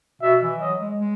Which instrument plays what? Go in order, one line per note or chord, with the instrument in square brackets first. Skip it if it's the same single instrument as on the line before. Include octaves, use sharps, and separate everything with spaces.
[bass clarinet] B2 [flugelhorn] E5
[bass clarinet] E3
[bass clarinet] F#3 [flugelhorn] D#5
[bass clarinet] G#3
G#3